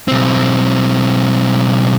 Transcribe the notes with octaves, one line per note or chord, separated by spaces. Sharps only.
B1 C4